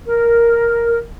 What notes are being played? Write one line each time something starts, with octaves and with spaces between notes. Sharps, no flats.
A#4